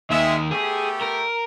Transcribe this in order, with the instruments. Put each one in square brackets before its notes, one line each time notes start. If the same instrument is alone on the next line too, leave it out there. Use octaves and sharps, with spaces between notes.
[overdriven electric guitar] D#2 D#3 [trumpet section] G#3 E5
[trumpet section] A3 B3 G4 [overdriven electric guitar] G#4
[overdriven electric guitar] A#4